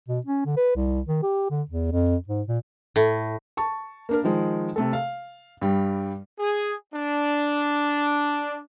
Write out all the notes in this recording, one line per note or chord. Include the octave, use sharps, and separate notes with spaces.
B2
C#4
D3
B4
C2
D#3
G4
D3
E2
F2
G#2
A#2
A2
A5 C#6
A#3 D4 A#4
D#3 F3 G#3
C3 A3 A4
F5
G2 G3
G#4
D4